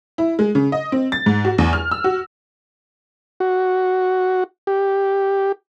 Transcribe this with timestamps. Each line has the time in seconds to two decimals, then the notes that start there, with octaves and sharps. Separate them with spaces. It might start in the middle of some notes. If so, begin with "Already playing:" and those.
0.18 E4
0.39 G#3
0.55 C#3
0.72 D#5
0.92 C4
1.12 A6
1.26 G#2
1.45 F#4
1.58 E2
1.73 F6
1.91 E6
2.04 F#4
3.40 F#4
4.67 G4